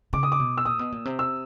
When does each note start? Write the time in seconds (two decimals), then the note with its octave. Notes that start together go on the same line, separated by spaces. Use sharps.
0.13 C#3 D6
0.23 D#6
0.32 D6
0.40 B2
0.58 E6
0.65 A#2 D#6
0.79 B2
0.92 A#2
1.05 C3
1.19 E6